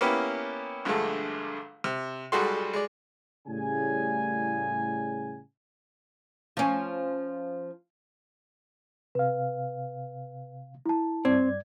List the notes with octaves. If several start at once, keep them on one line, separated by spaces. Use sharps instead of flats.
A#3 B3 C#4 E4 G4 B4
A#1 G2 D3 G#3 A3
C3
B1 G3 G#3 F#4 A4 C6
G#3 D5
A2 C#3 G3 G#5
F3 C#4
C3 B4 F5
E4 A5
G2 C4 D5 G#6